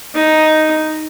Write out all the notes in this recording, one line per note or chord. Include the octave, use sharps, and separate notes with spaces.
D#4